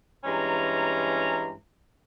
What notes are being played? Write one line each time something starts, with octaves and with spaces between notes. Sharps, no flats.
G2 E3 G#3 C#4 A#5